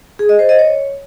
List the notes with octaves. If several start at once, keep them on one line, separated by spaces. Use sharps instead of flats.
G#4
D#5
C5
D#5
C#5